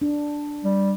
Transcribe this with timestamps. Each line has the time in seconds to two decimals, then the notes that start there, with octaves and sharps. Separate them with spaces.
0.02 D4
0.64 G3